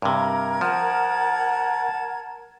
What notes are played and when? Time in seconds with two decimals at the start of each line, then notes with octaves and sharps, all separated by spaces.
0.02 G2 C3 A#4 A#5 G#6
0.61 F3 F#5 A5